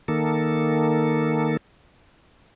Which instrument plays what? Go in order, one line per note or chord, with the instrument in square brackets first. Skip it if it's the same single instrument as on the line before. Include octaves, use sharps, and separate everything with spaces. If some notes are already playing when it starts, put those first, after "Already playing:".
[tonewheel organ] D#3 A#3 A4